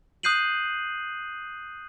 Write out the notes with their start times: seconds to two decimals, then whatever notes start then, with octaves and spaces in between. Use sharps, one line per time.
0.23 D#6 F#6 G6 C7 D#7 F#7